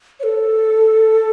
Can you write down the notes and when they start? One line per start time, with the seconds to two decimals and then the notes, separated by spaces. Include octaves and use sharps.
0.20 C#5
0.23 A4